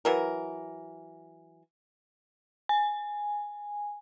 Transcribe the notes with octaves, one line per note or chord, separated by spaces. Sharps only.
E3 F#3 A#4
G#5